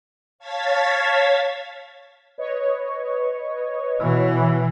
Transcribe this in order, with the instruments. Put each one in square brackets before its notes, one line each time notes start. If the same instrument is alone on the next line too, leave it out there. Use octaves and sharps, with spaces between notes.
[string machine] C#5 F5 A5 G#6 A6 B6
[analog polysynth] B4 C#5 D#5
[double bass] B2 E3